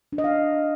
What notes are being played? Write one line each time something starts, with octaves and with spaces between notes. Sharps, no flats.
D4
D#5
F5